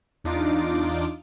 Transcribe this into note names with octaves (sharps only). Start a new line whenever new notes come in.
E2 D4 D#4 F4 D6